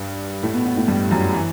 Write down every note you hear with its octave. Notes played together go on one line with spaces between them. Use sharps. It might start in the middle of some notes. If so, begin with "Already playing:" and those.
Already playing: G2 G3
A2 A3
B2 B3
B2 B3
A2 A3
G2 G3
F#2 F#3
E3